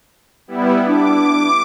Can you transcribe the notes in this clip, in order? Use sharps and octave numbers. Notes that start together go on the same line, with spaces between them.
G3 B3 E4
D4 D6